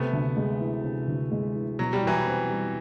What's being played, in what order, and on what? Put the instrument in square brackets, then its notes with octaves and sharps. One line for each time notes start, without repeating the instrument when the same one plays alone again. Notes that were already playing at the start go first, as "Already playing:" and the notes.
Already playing: [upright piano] C3 [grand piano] A3 B3
[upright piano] D2
G#3
E3
C3
D2
G#3
E3
[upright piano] B2 [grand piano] F#3
[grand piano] G3
[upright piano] E2 [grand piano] E3 F#3
[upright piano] C4
G3